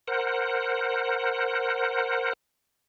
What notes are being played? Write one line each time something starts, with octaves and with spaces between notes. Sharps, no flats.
A#4 C5 F#5